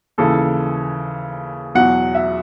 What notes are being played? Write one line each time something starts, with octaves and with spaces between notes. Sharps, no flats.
D#2 C#3 E3 A4
E2 B2 F#3 F#5
E5